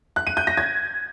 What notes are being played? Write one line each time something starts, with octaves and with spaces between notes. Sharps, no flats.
F#6
D#7
G6
A#6
G#6